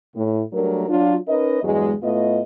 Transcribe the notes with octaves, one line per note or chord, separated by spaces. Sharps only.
A2
F#3 G3 A3 D4 A#4
F#3 D4 F4
C#4 D#4 A#4 B4 D#5
E2 G2 F#3 G#3
A2 A3 B3 F4 D#5